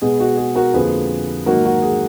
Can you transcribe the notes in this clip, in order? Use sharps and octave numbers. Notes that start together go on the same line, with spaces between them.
B2 G#3 B3 G#4
F#4
G#4
F#4 A#4
F2 D3 F3 A#3 G#4 B4
G#2 D#3 F#3 A#3 F#4 A#4
F#4
G#4